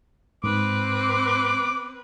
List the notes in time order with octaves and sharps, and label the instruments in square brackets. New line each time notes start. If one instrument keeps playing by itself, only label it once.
[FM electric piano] G#2 [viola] C4 B4 [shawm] D6